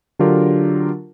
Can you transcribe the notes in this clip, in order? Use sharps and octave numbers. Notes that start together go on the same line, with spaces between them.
D3 F#3 D4 F4 G4 A#4